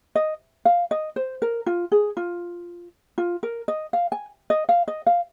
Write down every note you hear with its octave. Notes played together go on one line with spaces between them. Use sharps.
D#5
F5
D#5
C5
A#4
F4
G#4
F4
F4
A#4
D#5
F5
G#5
D#5
F5
D#5
F5